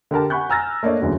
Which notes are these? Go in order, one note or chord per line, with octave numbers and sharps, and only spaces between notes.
D3 G4 A#4 A5
F#5 G#5 B5 C#6 F#6 G6
G#5 A#5 E6 F6 A6 A#6
A3 A#3 D4 C#5 D#5
F#1 E2 D3 F#3